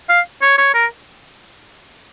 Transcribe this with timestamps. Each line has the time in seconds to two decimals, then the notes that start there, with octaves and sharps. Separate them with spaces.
0.09 F5
0.42 C#5
0.58 C#5
0.74 A#4